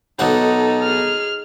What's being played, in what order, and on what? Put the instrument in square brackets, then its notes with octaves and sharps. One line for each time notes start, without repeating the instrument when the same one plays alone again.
[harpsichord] B1 F#5 [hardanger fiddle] D#4 [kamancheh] A4
[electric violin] G#4 F6